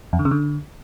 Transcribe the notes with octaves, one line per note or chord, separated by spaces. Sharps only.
F2
D3
C#3
D3